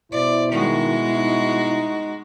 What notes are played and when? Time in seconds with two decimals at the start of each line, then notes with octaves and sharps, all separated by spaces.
0.12 B2 E4 C5 D5
0.52 D#3 G#3 F#4
1.15 D#4